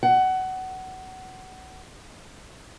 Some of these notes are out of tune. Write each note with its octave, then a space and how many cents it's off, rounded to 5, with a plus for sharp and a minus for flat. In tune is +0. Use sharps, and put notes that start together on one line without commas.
F#5 +20